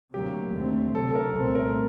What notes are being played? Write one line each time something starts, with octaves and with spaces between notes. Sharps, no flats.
D2 C3 F#3 A#3 G4
D#2 D3 A3 C4
D2 C3 F#3 A4
A4
A#4
C2 A#2 A3 C4 A4
A#4